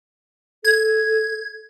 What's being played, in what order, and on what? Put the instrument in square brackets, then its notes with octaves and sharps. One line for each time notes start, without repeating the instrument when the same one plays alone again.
[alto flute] A4 [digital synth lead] G#6